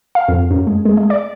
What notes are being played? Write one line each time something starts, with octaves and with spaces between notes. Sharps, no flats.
F5
F2
F#2
G#3
G#3
G#3
D5